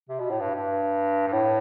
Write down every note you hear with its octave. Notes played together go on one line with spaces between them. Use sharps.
C3
B2
A2
G2
G2
G2
A2